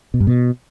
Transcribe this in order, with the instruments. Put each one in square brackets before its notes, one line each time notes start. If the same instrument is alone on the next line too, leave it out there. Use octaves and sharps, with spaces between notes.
[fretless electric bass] B2
G2
B2